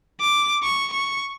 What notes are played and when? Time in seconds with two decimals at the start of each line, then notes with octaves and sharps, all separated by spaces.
0.21 D6
0.63 C#6
0.93 C#6